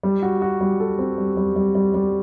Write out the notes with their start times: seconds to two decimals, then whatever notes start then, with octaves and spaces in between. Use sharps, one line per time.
0.03 G3
0.23 F#4
0.42 F#4
0.61 G3
0.80 A4
0.99 C4
1.18 G3
1.37 G3
1.56 G3
1.75 G3
1.94 G3